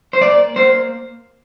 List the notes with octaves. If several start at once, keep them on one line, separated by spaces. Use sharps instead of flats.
C5
A#3 D5
A#3 C5